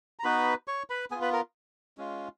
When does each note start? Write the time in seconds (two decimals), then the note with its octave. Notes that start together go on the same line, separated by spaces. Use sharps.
0.19 A#5
0.24 B3 D#4 F#4 B4 B5
0.68 C#5 C#6
0.90 B4 B5
1.11 B3 G#4 G#5
1.15 F4
1.22 B4 B5
1.33 A#4 A#5
1.98 G#3 C#4 F4